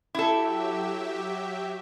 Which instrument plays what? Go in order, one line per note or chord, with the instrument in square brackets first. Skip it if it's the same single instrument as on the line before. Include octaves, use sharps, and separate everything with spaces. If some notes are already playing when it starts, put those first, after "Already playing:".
[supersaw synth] F#3 G4 E5 [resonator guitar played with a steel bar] E4 A4